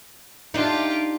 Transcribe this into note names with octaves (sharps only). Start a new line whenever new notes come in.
D4 D#4 F4 G4